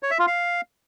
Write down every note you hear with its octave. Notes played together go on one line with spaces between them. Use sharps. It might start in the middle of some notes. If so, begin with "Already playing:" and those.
C#5
E5
F4
F5